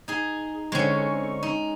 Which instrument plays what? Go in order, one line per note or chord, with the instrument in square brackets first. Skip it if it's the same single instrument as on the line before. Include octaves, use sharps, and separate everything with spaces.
[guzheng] D#4 G#4
[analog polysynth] D3 C4 C#6 [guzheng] G#3 C#4
[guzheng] D#4